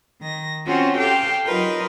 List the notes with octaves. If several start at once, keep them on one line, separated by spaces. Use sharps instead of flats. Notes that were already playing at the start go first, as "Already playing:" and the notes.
D#3 A#6
C4 C#4 F4 F#4
G4 A4 F5 G5 A5
F#3 D#4 F4 A#4 B4